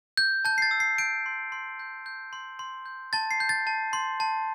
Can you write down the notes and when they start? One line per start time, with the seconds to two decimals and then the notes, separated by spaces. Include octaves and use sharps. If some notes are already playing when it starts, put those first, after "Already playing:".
0.17 G6
0.45 A5 G6
0.58 C7
0.62 A6
0.71 E6
0.80 C7
0.98 G6 D7
1.26 C6
1.52 C6
1.80 G6
2.06 G6
2.33 C6
2.59 C6
2.86 G6
3.13 A5 A6
3.31 C7
3.40 G6
3.49 A6
3.67 A5
3.93 C6
4.20 A5